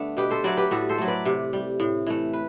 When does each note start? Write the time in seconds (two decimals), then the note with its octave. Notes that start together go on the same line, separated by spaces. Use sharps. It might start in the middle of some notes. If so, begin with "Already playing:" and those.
Already playing: D3 A3 B3 D4
0.17 B2 G4 B4
0.31 A4 C5
0.44 F#3 A3 B4 D5
0.57 G4 B4
0.71 A2 F#4 A4
0.89 A4 C5
0.98 F#3 A3
1.07 B4 D5
1.25 C3
1.53 G3
1.80 A2
2.07 E3 A3
2.33 B4